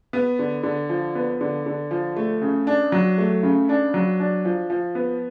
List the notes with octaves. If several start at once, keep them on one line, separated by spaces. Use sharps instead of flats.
B3
D3
D3
F3
B3
D3
D3
F3
A3
C#3
D4
F#3
A3
C#3
D4
F#3
D4
F3
F3
B3